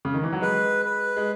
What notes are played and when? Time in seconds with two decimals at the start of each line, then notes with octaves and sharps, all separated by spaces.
0.05 C#3
0.14 D#3
0.23 E3
0.33 F#3
0.42 G#3 B4
0.85 B4
1.17 G#3